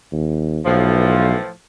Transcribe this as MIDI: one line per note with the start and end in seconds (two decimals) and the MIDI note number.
0.12 0.60 39
0.66 1.35 35
0.66 1.48 45
0.66 1.48 52
0.66 1.48 53